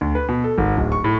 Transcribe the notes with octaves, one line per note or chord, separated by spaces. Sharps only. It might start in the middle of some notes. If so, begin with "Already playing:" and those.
D2
B4
B2
A4
G#1
D1
C#6
A2